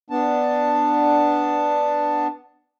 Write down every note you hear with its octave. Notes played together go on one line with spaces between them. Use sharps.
B3 D4 A5